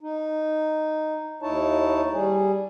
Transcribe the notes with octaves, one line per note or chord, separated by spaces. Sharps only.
D#4
D#2 D#4 E4 C#5 A5
G3 G#4